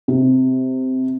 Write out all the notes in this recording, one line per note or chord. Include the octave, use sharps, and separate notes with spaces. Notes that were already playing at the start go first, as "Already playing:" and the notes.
C3